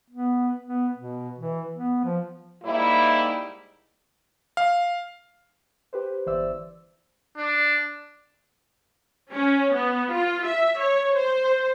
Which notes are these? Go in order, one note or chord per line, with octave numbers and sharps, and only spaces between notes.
B3
B3
B2
E3
B3
F3
G#2 G3 A#3 D#4 E4
F5
G4 B4 C5
G1 E3 C5 D5 E5 E6
D4
C#4
B3
F4
E5
C#5
C5